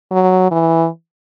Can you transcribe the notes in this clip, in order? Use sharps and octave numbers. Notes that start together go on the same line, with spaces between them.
F#3
E3